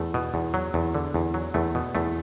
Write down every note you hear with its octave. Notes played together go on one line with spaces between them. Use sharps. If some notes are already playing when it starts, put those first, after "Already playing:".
Already playing: E2 A3
B2
E2
F#3
E2
D3
E2
F#3
E2 A3
B2
E2 A3